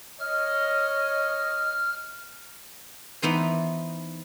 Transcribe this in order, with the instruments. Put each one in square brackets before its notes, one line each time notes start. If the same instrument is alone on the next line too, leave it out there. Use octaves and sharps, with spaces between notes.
[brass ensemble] C#5 D#5 [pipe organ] F6
[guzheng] E3 B3 D#4 C5